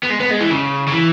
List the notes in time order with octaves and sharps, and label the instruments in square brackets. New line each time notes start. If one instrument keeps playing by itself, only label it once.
[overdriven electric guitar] B3
G#3
B3
G#3
E3
C#3
C#3
E3